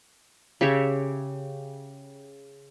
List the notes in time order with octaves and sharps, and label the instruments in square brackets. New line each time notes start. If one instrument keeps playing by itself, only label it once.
[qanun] C#3 G4 C#5 E5